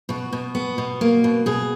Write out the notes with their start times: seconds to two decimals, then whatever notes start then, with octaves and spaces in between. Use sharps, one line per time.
0.09 B2 F#4
0.33 B2
0.55 B3
0.78 B2
1.01 A#3
1.24 B2
1.46 B2 G#4